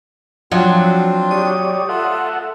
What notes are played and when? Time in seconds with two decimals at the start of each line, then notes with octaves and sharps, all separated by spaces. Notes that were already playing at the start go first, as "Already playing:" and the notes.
0.52 F3 F#3 C4 D4 F4
1.31 G4 C#5 D5 D#6
1.89 F4 A4 E5 F#5